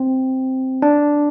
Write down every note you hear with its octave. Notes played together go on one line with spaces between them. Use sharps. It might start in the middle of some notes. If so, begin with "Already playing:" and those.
Already playing: C4
D4